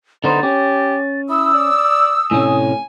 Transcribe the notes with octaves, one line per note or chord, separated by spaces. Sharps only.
D3 B3 D#4 C5 A6
C#4 G4
E4 D#6 E6
D5
A2 C3 C#4 G#5